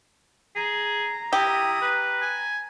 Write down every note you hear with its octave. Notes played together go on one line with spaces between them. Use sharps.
G#4 A#5
E4 G4 D#6
B4
G#5